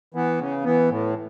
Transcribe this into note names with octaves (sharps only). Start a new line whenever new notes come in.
E3 B3
C#3
E3 B3
A2